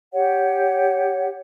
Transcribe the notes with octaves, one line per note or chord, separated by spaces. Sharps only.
G4 C#5 F#5